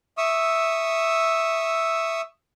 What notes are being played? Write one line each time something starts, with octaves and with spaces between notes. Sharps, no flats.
E5 C#6 D#6 E6